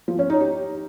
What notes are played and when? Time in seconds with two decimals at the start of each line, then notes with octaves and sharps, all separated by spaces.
0.08 F3
0.19 C#4
0.30 D#4
0.41 G4